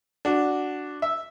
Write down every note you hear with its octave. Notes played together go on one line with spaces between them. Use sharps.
D4 F#4
E5